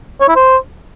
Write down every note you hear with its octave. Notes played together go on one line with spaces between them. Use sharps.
C#5
E4
C5